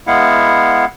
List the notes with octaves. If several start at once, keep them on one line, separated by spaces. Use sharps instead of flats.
G#3 B3 E4 F5 F#5